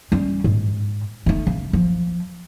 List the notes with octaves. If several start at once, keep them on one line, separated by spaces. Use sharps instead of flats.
G3 C#4
G#2
A3 D#4
C#3
F3